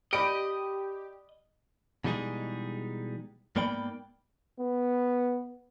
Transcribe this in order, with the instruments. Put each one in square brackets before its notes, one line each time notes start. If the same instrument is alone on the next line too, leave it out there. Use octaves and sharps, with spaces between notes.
[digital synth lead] G4 [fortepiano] D5 B5 [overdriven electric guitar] D#5 [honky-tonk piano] D7
[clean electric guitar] B2 E3 G3 G#3 D#4 G#4
G#2 A#3 B3 D5 G5 B5
[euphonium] B3